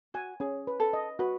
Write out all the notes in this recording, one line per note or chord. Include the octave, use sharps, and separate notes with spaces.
F#4 G#5
C#4 G#4
B4
A4
D#5
F#4 B4